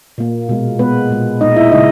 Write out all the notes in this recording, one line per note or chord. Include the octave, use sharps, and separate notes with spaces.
A#2 A#3
B2 G#3
B2 G#3 B3 B4
A#2 G#3
A#2 G#3 D#4 D#5
E4 E5
C#3 G#3 D#4 D#5